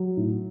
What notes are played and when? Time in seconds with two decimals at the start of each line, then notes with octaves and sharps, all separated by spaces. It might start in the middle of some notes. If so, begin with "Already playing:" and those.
Already playing: F#3
0.17 A2